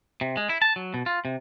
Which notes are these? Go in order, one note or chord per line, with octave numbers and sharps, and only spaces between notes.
C3
G#3
E4
A5
F#3
B2
F4
C3